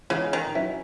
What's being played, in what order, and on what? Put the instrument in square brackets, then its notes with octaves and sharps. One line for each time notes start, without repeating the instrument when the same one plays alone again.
[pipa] C#3 [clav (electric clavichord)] E3 G#3 B3
[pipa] D#3
[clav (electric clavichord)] F#3 C#4 E4 B4